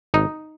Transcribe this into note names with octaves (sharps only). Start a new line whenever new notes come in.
G#1 D#4